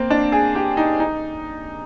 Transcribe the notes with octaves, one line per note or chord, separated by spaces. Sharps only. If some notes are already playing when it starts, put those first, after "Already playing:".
Already playing: A#3 C4
D4
G#4
G4
D#4
D#4